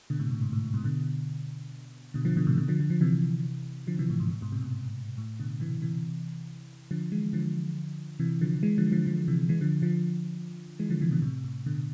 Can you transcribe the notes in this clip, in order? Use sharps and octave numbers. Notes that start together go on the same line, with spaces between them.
B2 D3
A2 C3
A2
G#2
A2
G#2 B2
B2 D3
B2 D3
D3 F3
B2 D3
A2 C3
B2 D3
D3 F3
D3 F3
D3 F3
C3 E3
D3 F3
C3 E3
A2
G#2
A2
G#2 B2
A2 C3
G#2 B2
A2
B2 D3
C3 E3
C3 E3
D3 F3
E3 G#3
D3 F3
C3 E3
D3 F3
E3 G#3
D3 F3
D3 F3
D3 F3
C3 E3
E3 G#3
D3 F3
D3 F3
E3 G#3
D3 F3
C3 E3
B2 D3
A2 C3
A2
B2 D3